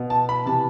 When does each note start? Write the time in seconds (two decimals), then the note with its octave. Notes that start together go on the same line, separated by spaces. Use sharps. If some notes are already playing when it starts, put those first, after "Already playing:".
Already playing: B2
0.10 A5
0.29 B5
0.46 C3 E3 A5